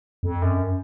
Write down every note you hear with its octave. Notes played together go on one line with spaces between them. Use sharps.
F2
F#2